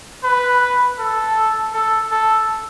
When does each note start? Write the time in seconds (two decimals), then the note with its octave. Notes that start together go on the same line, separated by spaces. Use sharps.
0.24 B4
0.99 A4
1.74 A4
2.11 A4